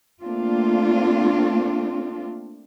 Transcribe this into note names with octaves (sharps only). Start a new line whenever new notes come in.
A3 A#3 C4 D4 F4